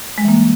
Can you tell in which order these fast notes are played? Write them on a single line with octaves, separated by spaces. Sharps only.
G#3 G3 E3 A#3